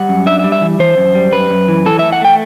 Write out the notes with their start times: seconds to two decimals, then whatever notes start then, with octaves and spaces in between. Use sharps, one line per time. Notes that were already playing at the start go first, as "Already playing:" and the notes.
Already playing: G3 F#5
0.09 F#2
0.26 D4 E5
0.39 E5
0.44 G3
0.52 E5
0.61 E3
0.79 E3 C5
0.97 F#2
1.15 G3
1.32 F#2 B4
1.50 F#2
1.68 E3
1.86 E3 A4
1.99 A3 E5
2.12 F#5
2.21 A3 G5